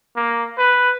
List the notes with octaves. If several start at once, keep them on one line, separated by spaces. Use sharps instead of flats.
A#3
B4